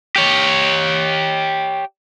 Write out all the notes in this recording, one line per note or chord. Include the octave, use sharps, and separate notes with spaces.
G4 C#5